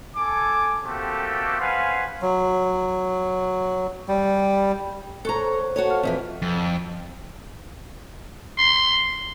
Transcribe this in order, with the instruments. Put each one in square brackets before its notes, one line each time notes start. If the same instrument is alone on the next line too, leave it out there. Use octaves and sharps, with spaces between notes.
[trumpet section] A4 G#5 D6
A3 A#3 C4 F#4 G4 A4
C#4 B4 C5 F5 F#5 G#5
[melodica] F#3
G3
[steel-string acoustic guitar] A4 A#5 [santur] C5 C#5 F#5
[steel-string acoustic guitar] F#4 A4 C#5
[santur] F5
[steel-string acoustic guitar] F2 D#3 E3
[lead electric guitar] F2
[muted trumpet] C6